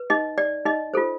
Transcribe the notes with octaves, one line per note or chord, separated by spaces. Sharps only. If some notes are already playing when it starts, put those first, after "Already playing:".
Already playing: B4
D#4 D#5
D5
D#4 D#5
F4 A4 C5